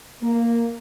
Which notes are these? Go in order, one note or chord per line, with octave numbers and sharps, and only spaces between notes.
A#3